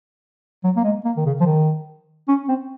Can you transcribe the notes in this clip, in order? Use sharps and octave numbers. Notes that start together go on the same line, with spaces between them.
F#3
A#3
G#3
A#3
D#3
C#3
F3
D#3
C#4
C4